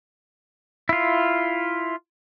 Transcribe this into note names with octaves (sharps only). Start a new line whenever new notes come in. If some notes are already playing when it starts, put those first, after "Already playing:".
E4 F4